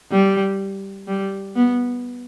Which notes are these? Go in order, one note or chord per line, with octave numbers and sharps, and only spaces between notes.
G3
G3
B3